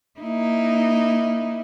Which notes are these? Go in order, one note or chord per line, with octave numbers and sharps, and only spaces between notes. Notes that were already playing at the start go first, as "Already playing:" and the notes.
A#3 D#4 E4